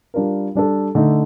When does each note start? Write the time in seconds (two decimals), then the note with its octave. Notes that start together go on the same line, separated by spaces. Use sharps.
0.14 G3 D4 F4 A#4
0.55 G3 D4 A4
0.95 D3 A3 D#4